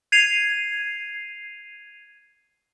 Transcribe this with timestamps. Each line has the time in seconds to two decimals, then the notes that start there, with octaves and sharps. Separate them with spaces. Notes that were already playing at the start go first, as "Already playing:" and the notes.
0.12 G#6 C7 D#7 F7